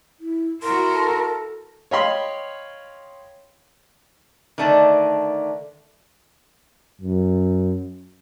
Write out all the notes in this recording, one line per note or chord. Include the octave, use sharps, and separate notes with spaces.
E4
E4 F#4 A#4 C6
A4
C#5 D#5 F5 G5 B5 C6
D3 D#3 A3 D4 A5
F#2